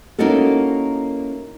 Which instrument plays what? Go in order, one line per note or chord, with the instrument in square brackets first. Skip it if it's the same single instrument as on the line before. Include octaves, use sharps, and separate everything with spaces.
[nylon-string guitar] A#3 C#4 D#4 E4 F#4 A4